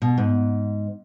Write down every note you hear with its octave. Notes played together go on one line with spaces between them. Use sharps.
B2
G#2